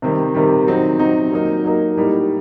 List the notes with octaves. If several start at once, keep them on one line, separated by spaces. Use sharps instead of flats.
C3 D#3 G3
C3 D#3 G3
F#3 C4 D#4
F#3 C4 D#4
F#3 A#3 D#4
F#3 A#3 D#4
A2 G3 A#3 D#4